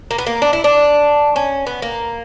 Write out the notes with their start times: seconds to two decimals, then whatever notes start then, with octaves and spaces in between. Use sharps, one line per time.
0.11 A#3
0.18 B3
0.26 A#3
0.42 D4
0.53 E4
0.64 D4
1.36 C#4
1.67 B3
1.82 A#3